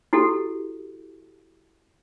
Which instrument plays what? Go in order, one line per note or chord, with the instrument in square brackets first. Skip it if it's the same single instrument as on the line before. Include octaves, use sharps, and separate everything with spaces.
[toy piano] E4 F#4 G4 A4